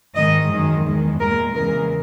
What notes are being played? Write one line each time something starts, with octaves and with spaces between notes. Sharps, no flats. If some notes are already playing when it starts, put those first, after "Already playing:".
G#2 D#3 G#3 D#5
F#2 D#3 G#3
E2 D#3 G#3
A#2 G#3 A#4
E2 C#3 E3 G#3 A#4